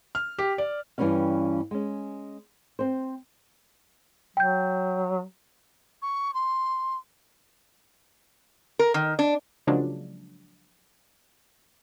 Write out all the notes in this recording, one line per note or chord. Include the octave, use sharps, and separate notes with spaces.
F6
G4
D5
G2 E3 G3 A#3 C#4 F5
G#3 C#4
C4 C5
F#3 G5 G6
C#6
C6
A#4
D#3
D4
C#3 F3 F#3 G#3 A#3 D4